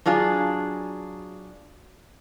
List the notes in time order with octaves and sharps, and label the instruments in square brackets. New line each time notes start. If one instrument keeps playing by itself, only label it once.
[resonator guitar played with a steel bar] F#3 D4 F4 G#4